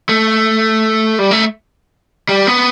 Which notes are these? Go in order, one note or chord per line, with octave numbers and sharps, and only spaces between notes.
A3
G3
A3
G3
B3